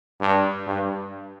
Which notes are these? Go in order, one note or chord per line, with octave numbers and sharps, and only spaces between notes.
G2
G2